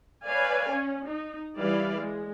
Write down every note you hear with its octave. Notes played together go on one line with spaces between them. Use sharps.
B4 C#5 D5 F5 G#5
C#4
D#4
E3 G3 E4 B4 D5 F5
G#3